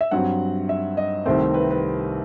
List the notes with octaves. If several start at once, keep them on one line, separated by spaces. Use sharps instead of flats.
E5
G2 F#3 C4 F#5
E5
D#5
C2 C3 D#3 A3 C4 C5
B4
B4